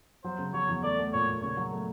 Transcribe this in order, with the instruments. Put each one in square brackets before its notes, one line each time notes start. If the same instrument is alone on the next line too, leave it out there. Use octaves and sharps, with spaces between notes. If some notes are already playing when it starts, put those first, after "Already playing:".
[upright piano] F#3 [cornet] C5
[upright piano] C#3
[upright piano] F#3 [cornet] C#5
[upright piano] E2
[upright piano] A3 [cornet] D5
[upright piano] A3
[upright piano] A#2 [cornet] C#5
[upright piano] A#2
[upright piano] C#3 [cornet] C#5
[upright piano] F#3
A3